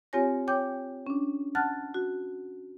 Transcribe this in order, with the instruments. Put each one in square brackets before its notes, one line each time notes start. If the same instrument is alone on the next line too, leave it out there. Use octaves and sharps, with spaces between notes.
[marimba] C4 F4 G4 C#5 G#5 A#6
C#5 G5 D6 G6
C#4 D4
F#5 A5 F6 F#6 A6
F#4